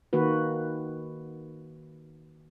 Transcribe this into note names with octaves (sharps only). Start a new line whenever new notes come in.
D#3 A#3 F#4 B4